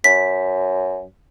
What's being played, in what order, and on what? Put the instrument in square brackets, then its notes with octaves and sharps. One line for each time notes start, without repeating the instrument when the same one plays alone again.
[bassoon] F#2 [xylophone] B6